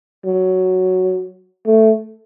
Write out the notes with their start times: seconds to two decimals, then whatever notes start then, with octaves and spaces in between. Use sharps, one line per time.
0.25 F#3
1.66 A3